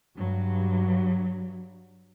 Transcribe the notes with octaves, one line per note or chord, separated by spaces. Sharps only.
G2 F#3